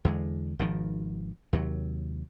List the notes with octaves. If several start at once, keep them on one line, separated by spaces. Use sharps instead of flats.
E2 D3 G#3
G#1 B2 D#3 F3
D#2 C3 F#3